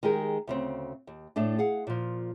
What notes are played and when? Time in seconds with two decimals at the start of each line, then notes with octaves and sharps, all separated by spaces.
0.03 D#3 G#3 G4 G#4 A#4
0.47 D2 C#3 C4
1.07 D#2
1.36 A2 A3 D4
1.59 G#4 F5 F#5
1.87 A#2 F3